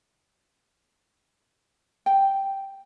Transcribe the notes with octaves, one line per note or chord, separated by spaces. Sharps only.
G5